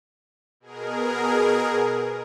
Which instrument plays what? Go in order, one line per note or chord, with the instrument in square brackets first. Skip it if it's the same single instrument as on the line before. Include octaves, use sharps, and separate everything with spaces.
[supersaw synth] B2 G#4 A#4